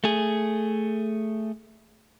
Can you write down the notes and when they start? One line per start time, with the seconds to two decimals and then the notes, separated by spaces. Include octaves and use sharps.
0.04 A3 G#4